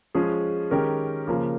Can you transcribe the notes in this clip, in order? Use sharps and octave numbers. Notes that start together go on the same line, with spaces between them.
F3 G#3 C#4 G#4
D#3 G#3 C#4 G4 A#4
C#3 F3 A#3